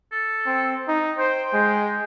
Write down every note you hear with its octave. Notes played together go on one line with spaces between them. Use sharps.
A4
C4
D#4
C5 G5
G#3